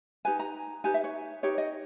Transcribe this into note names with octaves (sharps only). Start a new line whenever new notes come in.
D#4 G4 B4 G#5
A#5
D#4 G4 B4 G#5
E5
C#5
D#4 G4 B4 C#5
D#5